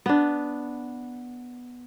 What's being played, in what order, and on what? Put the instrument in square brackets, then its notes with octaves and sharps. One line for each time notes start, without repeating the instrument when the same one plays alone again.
[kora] B3 D4